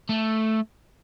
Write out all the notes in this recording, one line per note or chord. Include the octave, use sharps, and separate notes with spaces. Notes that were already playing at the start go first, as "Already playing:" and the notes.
A3